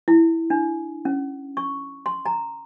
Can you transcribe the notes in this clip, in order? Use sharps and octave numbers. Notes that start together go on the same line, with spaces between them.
E4
D4
C#4
C#6
C6
A#5